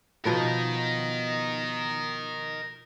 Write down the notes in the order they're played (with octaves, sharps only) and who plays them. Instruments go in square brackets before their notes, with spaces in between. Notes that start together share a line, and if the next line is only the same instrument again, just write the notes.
[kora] B2 F3 B3 [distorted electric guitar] A#4 D#5